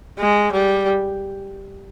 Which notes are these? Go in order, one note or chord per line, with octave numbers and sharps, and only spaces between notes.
G#3
G3